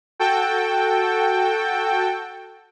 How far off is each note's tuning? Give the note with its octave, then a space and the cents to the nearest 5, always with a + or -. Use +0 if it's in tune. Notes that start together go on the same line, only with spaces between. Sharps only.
F#4 -5 A4 +0 G5 +10